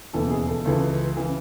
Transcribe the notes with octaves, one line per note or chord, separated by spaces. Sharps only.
E1 D#2 C#3 E3 A4
G#4
A4
C#2 C#3 E3 A4
C#3 E3